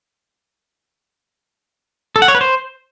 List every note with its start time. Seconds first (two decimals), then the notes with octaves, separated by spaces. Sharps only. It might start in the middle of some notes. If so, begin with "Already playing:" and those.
2.16 A4
2.22 F#5
2.28 C#5
2.35 B4
2.41 C5